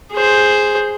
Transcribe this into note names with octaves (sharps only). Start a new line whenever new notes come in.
G#4 C5